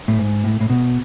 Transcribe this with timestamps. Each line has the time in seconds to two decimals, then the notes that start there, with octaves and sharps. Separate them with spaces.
0.08 A2
0.18 G#2
0.44 A2
0.60 A2
0.70 B2